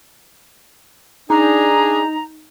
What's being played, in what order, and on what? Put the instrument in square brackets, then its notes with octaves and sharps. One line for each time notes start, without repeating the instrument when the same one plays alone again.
[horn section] D4 G#4 [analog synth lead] D#4 [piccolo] A#5